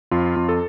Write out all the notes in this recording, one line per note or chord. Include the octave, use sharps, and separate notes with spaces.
F2 F4
F2
A4